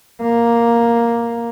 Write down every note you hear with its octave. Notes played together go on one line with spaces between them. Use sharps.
A#3